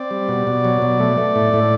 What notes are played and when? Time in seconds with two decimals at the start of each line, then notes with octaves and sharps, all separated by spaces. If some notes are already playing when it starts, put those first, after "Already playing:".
Already playing: C4 D5
0.11 G3
0.29 B2
0.47 B2
0.65 F#3
0.82 B2
1.00 A3
1.17 A3
1.35 A2
1.53 A2